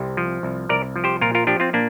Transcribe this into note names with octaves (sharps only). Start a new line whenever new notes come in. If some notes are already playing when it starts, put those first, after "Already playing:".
Already playing: C2 C3 G4 C5
F3
C2
C2 A#4 D5
F3
G4 C5
A#2 F4 A#4
F4 A#4
F3 D4 G4
C4 F4
A#2 A#3 D4